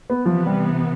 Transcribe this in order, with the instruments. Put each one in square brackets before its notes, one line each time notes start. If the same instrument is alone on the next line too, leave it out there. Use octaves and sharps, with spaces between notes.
[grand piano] B3
[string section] C3 E3 B3 [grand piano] F3
[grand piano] G3